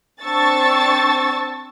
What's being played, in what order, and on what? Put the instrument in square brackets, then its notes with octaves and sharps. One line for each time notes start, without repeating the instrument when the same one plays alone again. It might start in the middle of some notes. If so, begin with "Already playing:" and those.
[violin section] C4 D4 A5 C#6 E6 A6